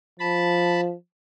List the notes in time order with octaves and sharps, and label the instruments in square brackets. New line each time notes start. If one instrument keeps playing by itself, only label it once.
[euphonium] F3 [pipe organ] A5 B5